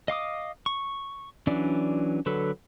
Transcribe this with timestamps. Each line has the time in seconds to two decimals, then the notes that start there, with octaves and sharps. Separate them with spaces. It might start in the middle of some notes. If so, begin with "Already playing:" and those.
0.08 D#5 F5 D6 D#6
0.66 C#6
1.47 E3 F#3 C#4 D4 D5
2.26 D3 F#3 A4 B4